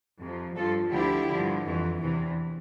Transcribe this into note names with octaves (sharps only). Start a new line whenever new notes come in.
F2 C3 F3
G2 F3 F4 A4
D2 D3 F3 E4 G4
G2 D3 F3
F2 E3
E2 C3 E3